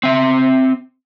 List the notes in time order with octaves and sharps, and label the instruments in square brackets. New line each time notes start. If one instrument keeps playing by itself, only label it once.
[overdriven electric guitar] C4 E5